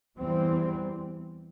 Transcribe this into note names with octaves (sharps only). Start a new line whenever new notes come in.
E2 E3 G3 C4